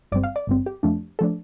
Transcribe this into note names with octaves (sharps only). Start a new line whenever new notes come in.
G1 G2 G3 C4 D5
F5
D5
G1 G2 G3 C4
G4
F2 F3 A3 D4
F3 A3 D4 A4